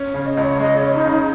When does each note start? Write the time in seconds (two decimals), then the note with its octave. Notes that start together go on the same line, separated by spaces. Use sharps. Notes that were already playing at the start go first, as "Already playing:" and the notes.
Already playing: C#4
0.08 C#5
0.14 C#3
0.26 D#5
0.37 C#2
0.43 C#5
0.60 G#3 D#5
0.77 C#5
0.83 C#4
0.94 D#4
1.05 C#3
1.11 D#4